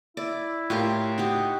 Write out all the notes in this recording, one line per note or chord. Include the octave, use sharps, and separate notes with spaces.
E4 D5
A2 F4 G4 A#4
D#4 F#4 G4 F#5